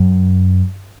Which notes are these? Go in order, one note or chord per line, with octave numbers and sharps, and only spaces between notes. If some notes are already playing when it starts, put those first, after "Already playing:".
Already playing: F#2